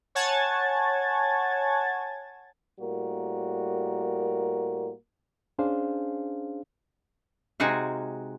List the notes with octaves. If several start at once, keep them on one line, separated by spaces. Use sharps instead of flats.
C#5 F#5 G#5 A5 G#6 A6
A2 G3 A#3 F#4 A#4
C#4 D4 G#4 C5 F5
C3 G#3 D#4 F#4 G#4 F5